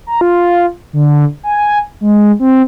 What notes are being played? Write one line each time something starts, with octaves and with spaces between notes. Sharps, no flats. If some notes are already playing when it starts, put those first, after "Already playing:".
A#5
F4
D3
G#5
G#3
C4